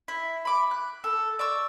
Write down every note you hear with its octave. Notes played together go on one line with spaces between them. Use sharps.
E4
B5 D6
F#6
A4
D5 C#6 E6